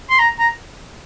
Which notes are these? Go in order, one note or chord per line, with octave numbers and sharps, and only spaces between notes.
C6
A#5
A#5